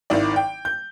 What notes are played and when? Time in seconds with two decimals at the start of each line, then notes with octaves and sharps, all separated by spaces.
0.10 G#1 D#3 E4 D5
0.36 G5
0.65 G6